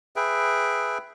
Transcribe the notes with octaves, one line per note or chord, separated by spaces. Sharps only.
G#4 B4 E5 G5